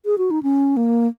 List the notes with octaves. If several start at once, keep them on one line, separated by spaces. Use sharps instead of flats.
G#4
F#4
D#4
C#4
A#3